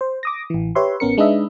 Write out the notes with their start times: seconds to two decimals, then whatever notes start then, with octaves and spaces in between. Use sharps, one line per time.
0.01 C5
0.23 D6 D#6 A#6
0.50 A1 E3
0.75 G4 B4 C#5 E5 C6
1.00 A1 B3 C#4 A#4 C#7
1.18 G#3 D4 D#4 B4 D#5 E5